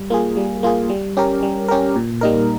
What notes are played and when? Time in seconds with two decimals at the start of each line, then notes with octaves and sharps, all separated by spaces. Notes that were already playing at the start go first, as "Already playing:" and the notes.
Already playing: G3
0.10 A#3 F4 G#4
0.37 G3
0.63 A#3 F4 G#4
0.89 G3
1.17 C#4 G4 A#4
1.43 G3
1.68 C#4 G4 A#4
1.96 A#2
2.21 G3 A#3 D#4 A#4